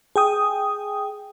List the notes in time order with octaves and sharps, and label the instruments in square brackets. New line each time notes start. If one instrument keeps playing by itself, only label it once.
[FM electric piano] G#4 G5 D#6